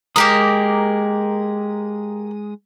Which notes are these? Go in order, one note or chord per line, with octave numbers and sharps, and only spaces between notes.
G#3 A#3 G4 A#4 D#6